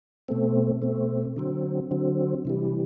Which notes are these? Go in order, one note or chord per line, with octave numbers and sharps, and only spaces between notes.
B2 A3 C4
B2 A3 C4
D3 F#3 C4
D3 F#3 C4
C3 E3 G3